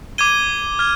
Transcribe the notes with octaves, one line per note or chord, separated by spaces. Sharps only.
D6 G#6 D#7 G7
F6 G#6